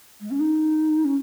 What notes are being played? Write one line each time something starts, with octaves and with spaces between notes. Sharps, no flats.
G#3
C#4
D#4
C#4